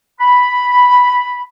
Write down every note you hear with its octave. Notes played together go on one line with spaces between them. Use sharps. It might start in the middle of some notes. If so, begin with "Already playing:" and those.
B5